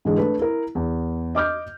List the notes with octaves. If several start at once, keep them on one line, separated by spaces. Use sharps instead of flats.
G#2 D3 E3 G#3
A3 D4 A4 B4
E4 A#4
E2
D#5 D6 F6 G6